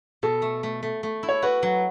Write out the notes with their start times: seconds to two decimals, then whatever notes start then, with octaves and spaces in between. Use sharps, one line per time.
0.23 B2 A4
0.42 A3
0.63 A3
0.83 A3
1.03 A3
1.23 E4
1.29 C#5
1.42 F#4 B4
1.63 F#3